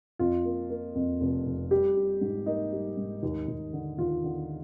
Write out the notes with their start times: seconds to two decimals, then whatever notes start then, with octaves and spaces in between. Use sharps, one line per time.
0.19 F2 F4
0.45 A#3
0.70 A#3
0.95 F2
1.20 F1
1.46 F2
1.71 G3 G4
1.96 G3
2.21 G#2
2.46 A#3 D#4
2.72 G3
2.97 G#2
3.23 D#2
3.48 D#2
3.73 D3
3.98 D#2 F4
4.24 D3